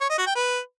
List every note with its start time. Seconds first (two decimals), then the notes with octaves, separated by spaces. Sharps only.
0.01 C#5
0.09 D#5
0.18 F#4
0.27 G5
0.35 B4